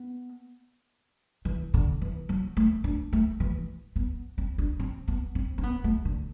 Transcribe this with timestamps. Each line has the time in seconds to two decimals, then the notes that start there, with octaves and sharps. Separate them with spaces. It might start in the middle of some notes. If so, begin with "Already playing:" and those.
Already playing: B3
1.45 E3
1.74 D3
2.02 E3
2.29 F#3
2.57 A3
2.84 D4
3.13 A3
3.40 E3
3.96 B3
4.38 C4
4.58 D4
4.80 C4
5.08 B3
5.35 C4
5.58 C4
5.63 B3
5.84 A3
6.05 D3